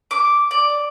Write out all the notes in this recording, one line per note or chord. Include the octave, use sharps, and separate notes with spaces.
D6
D5